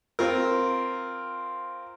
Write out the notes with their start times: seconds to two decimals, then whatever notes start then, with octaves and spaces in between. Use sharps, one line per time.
0.19 C4 F4 A#4